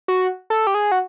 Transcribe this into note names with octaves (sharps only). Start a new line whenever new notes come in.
F#4
A4
G4
G#4
F#4